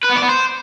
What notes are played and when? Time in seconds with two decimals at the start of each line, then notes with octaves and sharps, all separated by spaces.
0.03 B4
0.09 B3
0.16 D5
0.22 B3
0.29 C5